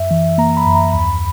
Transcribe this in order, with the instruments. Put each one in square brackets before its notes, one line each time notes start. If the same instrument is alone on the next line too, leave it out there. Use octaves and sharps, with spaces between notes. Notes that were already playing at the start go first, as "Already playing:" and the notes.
Already playing: [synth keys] F#2 E5
E3
A#3 A#5
B5
F#2
A#5
D#2 B5